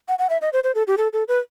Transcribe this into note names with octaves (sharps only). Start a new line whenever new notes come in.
F#5
F#5
E5
D#5
C5
C5
A4
G4
A4
A4
B4